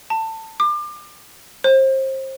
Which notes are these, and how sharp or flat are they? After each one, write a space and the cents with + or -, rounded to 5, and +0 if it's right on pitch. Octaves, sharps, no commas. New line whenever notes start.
A5 +20
D6 +30
C5 +30